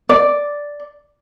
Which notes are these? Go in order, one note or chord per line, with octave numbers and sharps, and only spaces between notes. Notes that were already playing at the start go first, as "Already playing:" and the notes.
D5